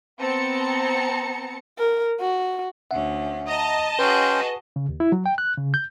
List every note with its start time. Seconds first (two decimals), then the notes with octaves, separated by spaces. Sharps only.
0.20 B3 C4 A5 A#5 C#7
1.79 A#4
2.20 F#4
2.91 D2 C#4 E5 F#5
3.47 D#5 A5 A#5 D#6
3.99 C#4 F#4 G#4 B4 G5 C6
4.76 C#3
4.89 D#2
5.00 E4
5.12 F#3
5.26 G5
5.38 F#6
5.57 C#3
5.74 G6